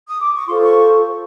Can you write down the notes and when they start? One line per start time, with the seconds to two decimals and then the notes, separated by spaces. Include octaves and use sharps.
0.07 D#6
0.21 D6
0.34 C#6
0.47 F4 A4 C5 C6
0.63 C#6